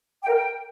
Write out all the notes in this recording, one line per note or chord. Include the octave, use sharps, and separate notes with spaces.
G5
A#4
G5